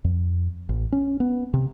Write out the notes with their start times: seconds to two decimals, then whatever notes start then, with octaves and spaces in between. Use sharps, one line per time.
0.04 F2
0.69 A1
0.92 C#4
1.20 B3
1.54 C3